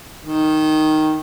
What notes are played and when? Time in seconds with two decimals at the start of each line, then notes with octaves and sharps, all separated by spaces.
0.24 D#3